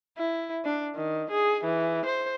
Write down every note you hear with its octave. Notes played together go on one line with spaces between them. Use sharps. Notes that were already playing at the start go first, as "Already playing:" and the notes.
E4
D4
D#3
G#4
E3
C5